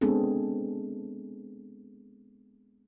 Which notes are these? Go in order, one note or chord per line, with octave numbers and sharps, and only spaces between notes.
G#3 B3 C4 D4 G#4 A4